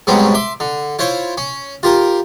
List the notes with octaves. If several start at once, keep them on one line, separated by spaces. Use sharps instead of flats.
G#2 B2 F#3 G3 C4 C#4
E5 C6 D6
D3
E4 F4 C5 C#5
C#4
F4 G4 A#4